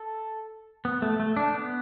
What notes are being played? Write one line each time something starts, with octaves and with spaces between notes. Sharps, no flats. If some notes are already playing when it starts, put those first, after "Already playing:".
Already playing: A4
B3
A3
A3
D4
B3